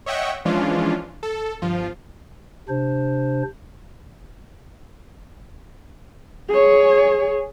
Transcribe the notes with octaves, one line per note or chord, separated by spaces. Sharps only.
C#5 D#5 E5 F#5 G5 C#6
E3 F3 G#3 C#4 D4 F4
A4
G1 F3 F4
C3 D4 C5
G#4 C#5